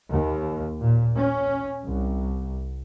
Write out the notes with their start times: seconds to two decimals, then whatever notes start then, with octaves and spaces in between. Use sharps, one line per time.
0.11 D#2
0.81 A#2
1.17 C#4
1.85 C2